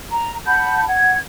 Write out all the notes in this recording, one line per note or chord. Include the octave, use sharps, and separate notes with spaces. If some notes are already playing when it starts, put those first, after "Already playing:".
A#5
F#5 A5 B5 G6
F#5 G#6